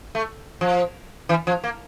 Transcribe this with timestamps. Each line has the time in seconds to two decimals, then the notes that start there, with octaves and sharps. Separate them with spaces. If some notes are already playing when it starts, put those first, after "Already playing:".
0.15 A3
0.61 F3
1.29 E3
1.47 F3
1.64 A#3